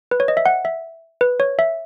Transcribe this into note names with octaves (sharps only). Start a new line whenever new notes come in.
B4
C#5
D#5
E5
F#5
E5
B4
C#5
E5